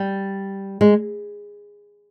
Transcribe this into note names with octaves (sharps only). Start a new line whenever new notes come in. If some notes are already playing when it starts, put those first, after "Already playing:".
Already playing: G3
G#3